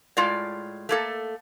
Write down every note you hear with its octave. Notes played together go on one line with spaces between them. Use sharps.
A2 G#3 F4 D5
A3 A#3 A4